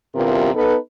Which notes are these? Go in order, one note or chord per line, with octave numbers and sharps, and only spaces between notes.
E2 G2 C3 F4 A#4
B3 D#4 A4 B4